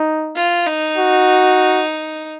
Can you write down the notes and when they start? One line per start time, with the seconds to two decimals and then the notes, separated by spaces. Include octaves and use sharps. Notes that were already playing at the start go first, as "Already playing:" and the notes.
Already playing: D#4
0.36 F4
0.67 D#4
0.97 F#4